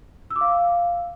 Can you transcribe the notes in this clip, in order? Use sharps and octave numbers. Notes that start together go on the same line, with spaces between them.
E6
D6
F5